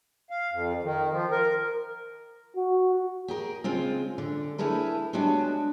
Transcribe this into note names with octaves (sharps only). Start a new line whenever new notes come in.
F5
F2
D#3
F3
A#4
F#4
G4 G#4 A#4
C#3 G#3 C4 F4
D3
A3 E4 G#4 A#4 B4
G3 G#3 B3 C#4 D4 F#4